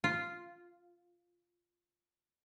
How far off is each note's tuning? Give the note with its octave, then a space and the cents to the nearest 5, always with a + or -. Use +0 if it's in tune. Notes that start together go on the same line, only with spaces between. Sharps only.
F4 -5